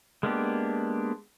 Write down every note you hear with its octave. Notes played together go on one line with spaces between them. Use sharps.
G#3 A#3 B3 D4 G4